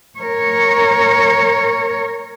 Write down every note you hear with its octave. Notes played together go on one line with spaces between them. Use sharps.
A#4 C#5